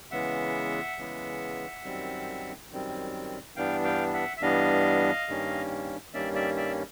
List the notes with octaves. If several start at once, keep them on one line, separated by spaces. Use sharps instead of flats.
C#3 E3 G#3 B3 E5 F#5
C#3 E3 G#3 B3
F#2 D#3 G3 C4
F#2 D#3 G3 C4
G2 E3 G3 B3 D4 F5 G5
F5 G5
E5 F#5
E5
G2 E3 G3 B3 D4 D#5 F5
G2 D#3 G3 A#3 C#4
G2 D#3 G3 A#3 C#4 D5 E5
D5 E5
D5 E5